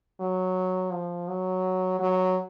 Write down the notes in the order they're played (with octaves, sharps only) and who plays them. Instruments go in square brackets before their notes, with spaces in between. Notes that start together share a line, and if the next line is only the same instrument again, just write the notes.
[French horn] F#3
F3
F#3
F#3